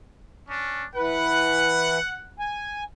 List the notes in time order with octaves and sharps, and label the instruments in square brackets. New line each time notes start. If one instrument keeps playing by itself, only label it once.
[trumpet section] C#4 D4
[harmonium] E3 B4 [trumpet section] F#5
[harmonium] G#5